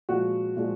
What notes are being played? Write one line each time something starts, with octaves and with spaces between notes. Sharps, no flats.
A#2 F3 G#3 F#4
A#2 F3 G#3